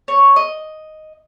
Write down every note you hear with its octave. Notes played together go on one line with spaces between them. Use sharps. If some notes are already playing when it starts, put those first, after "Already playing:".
C#5
D#5